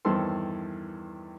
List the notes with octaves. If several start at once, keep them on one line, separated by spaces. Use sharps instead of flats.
E2 G2 D#3 C4 A4 C6